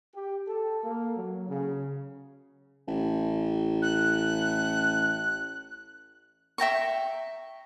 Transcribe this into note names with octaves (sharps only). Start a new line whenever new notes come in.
G4
A4
A#3
F#3
C#3
A1
F#6
E5 G5 A#5 C#6